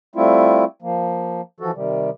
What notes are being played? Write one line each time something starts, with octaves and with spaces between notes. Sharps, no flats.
G3 A3 C4 E4 F4
F3 A#3
E3 F3 F#4 A4
C3 D#3 G3